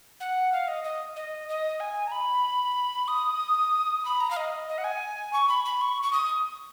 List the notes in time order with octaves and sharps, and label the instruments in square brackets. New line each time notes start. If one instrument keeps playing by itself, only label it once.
[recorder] F#5
F5
D#5
D#5
D#5
D#5
G#5
A#5
B5
D#6
B5
A#5
F5
D#5
D#5
F#5
G#5
C#6
B5
B5
C#6
C#6
D#6